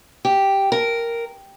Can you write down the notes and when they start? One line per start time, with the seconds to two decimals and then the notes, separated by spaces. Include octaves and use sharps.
0.25 G4
0.72 A#4